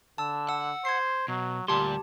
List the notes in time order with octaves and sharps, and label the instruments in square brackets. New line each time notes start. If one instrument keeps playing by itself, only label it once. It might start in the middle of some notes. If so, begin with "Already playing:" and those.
[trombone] D3 [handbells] A5 E6
[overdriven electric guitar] F#5 [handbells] E6
[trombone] C5 [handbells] G#6 C7
[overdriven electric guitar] B2 [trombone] F#3
[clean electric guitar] D2 C6 [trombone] A#2 [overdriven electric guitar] G3 [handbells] G4 A5